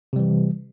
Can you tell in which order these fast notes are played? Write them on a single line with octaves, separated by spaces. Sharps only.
C3 G3 E3